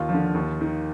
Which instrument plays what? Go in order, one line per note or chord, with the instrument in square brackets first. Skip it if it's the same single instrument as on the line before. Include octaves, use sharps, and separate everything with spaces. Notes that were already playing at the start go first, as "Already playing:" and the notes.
Already playing: [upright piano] D#2 F4
F3
D3
D#2
D#3